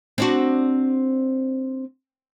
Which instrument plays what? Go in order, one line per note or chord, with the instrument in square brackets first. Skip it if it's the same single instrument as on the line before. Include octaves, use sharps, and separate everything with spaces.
[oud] C4 D4 F#4